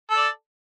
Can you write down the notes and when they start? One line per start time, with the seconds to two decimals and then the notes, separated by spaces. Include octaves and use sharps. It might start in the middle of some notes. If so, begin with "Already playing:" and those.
0.10 A4
0.13 A5
0.16 D5